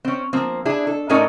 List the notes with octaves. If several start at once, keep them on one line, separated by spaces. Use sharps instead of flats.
C4 C#4
F3 A#3 C4
D4 E4 G#4
A4
A2 A3 C#4 D#4 A#4 D5